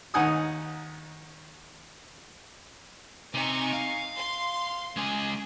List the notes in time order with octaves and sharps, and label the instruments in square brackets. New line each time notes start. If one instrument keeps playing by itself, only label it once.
[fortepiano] D#2 D#4 F#5 G#5 D#6
[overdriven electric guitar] C3 [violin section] D#4 G#5 C#6
[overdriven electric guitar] F5
[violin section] C6
[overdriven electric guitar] G#3 C#4 [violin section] G#4